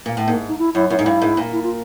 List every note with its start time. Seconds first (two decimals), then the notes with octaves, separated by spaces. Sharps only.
0.06 A#2
0.17 A2
0.27 G#2 A#3
0.48 D#4
0.59 E4
0.74 F#2 E4
0.90 F#2 E4
0.97 G#2 D#4
1.06 G2 E4
1.22 G#2
1.37 A#2
1.52 E4
1.63 F4